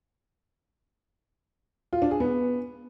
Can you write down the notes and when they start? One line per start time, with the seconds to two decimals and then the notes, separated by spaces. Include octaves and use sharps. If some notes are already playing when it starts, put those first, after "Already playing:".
1.93 F4
2.02 D4
2.11 G#4
2.20 B3